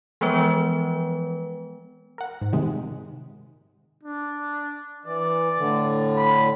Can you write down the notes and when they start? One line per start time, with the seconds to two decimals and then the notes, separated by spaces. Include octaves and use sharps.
0.21 E3 F3 G#3 B3 B4
2.18 A#4 F#5
2.41 G#2
2.53 C3 D#3 G#3
4.04 D4
5.06 E3 D5
5.59 A2 D3
6.17 B5